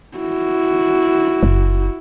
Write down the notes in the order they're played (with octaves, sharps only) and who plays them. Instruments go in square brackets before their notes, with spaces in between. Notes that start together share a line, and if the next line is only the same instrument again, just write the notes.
[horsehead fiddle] E4 F#4
[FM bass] F#1